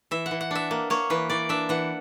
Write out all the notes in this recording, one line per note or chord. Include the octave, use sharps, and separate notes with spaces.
E3 E5
F#5
E3
F#5
D4 E5
A#3
A#3 C#5
E3 B4
E3 D5
D4 E5
E3 F#5